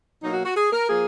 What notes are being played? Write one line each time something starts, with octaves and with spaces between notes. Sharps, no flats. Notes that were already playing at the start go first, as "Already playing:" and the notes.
B2 F#3 A#3 D#4
F#4
F#4
G#4
A#4
F3 A#3 G#4